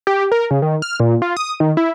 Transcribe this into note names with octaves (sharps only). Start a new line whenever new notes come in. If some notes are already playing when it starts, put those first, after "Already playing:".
G4
A#4
C#3
D#3
F6
A#2
F4
D#6
D#3
E4